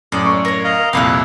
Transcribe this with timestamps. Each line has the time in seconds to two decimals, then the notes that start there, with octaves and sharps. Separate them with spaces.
0.12 F#2 A2 D5 D#6
0.25 C#6
0.45 A#4 C#5
0.64 D#5 F5 A#5
0.93 C2 F2 A#2 E4 F5 D6 F#6